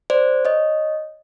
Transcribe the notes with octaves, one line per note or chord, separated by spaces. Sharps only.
C5 D5
C#5 D#5